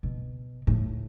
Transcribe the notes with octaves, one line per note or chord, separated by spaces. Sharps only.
B2
A2